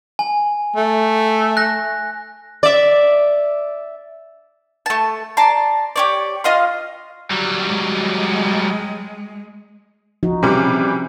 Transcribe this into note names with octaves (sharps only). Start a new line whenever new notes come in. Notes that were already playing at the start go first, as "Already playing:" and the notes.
G#5
A3
F#6 A#6
D5 E5
A3 A5
D5 A5 A#5 C6
G4 C#5 D5
F4 D#5 F5 C6
F#3 G3
G#3
F3 D#4 F#4
C3 E3 G3 C#4 G#4